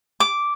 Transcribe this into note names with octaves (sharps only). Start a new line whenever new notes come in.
D6